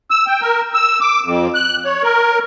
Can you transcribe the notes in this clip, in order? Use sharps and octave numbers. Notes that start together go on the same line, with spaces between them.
E6
G5
A#4
E6
D6
F2
F#6
C#5
A#4